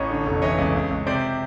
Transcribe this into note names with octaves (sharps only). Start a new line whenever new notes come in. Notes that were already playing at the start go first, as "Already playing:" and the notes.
Already playing: A1 C#5 D#5
D3
F1
E3 C#5 D#5
C#2
C#2
C#2
C3 C5 D5